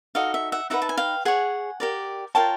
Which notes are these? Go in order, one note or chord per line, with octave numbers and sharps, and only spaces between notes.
D#4 F#4 A4 D#5 F5
E5
E5 F#5
D#4 G4 B4 E5 F#5
A5
G#5
F5 G5
G#4 C#5 F#5 G#5
G4 A#4 D5
F4 A#4 C#5 G5 A5